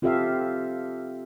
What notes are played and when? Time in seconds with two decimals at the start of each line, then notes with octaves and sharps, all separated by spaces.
0.02 C4 F4 G4 A4 E5 F5